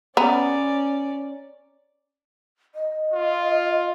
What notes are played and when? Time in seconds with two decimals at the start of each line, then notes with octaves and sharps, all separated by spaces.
0.17 B3 C#4 D5 A#5
2.75 D#5
3.13 F4